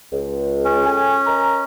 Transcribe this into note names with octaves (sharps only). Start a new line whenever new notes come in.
C#2
C#4
A4 G5 G#5
A#4 D#5 A#5